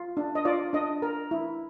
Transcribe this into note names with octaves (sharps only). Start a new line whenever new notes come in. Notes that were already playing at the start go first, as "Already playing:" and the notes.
Already playing: F4
D4
D#5
F4 D5
D4 D#5
A#4
E4